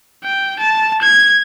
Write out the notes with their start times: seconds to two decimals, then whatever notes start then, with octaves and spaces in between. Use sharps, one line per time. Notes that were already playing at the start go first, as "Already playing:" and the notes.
0.24 G5
0.59 A5
1.02 G#6